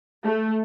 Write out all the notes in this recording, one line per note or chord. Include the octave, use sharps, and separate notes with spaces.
A3